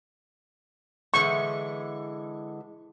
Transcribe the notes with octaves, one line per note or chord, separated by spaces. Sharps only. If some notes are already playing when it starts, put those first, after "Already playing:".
D3 E3 G#3 C#6